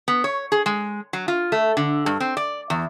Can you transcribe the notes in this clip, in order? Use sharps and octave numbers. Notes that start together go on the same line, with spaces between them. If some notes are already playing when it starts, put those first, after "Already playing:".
B3
C#5
G#4
G#3
F#3
F4
A3
D3
G2
C4
D5
E2